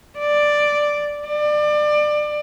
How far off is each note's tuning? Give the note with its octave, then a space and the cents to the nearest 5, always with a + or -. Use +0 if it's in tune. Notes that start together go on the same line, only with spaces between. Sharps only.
D5 +5
D5 +25